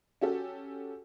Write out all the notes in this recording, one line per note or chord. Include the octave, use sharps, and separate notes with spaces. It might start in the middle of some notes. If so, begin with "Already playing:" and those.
C#4 F#4 G4 A4